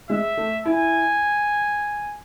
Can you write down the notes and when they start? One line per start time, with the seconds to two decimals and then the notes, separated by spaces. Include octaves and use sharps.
0.10 G#3 E5
0.37 A3
0.65 E4 G#5